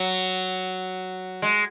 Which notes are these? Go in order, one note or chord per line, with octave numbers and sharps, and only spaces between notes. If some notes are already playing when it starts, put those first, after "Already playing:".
Already playing: F#3
G#3